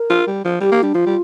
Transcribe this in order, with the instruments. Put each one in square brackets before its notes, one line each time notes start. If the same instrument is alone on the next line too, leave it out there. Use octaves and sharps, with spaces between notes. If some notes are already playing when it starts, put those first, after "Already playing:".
Already playing: [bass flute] A#4
[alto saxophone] F4
G3
F3
[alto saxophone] G3 [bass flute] G4
[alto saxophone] A#3
[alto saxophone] G3 [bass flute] D4
[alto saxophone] F3 [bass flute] F4
[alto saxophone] G3